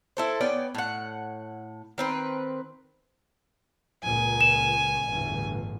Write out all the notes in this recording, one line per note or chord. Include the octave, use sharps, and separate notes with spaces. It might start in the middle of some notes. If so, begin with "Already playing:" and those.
E4 A4 C5
B3 C#4 D5 G5
A2 F#5
D#3 C4 B4
C#2 A#2 G#5
E7
G1 E2 A2